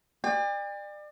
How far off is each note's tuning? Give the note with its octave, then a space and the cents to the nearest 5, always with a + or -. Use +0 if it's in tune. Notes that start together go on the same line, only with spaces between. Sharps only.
D5 +35 G5 +45